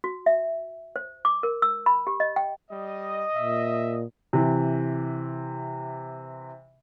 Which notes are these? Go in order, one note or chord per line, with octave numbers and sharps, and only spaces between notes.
F#4
E5
C5
D6
A#4
E6
B5
G4
D#5
G5
G3 D#5
A#2 E5
C3 E3